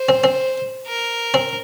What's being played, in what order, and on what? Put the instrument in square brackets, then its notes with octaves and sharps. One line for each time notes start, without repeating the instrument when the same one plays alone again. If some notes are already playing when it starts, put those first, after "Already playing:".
Already playing: [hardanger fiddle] C5
[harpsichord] C4
C4
[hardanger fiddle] A#4
[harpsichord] C4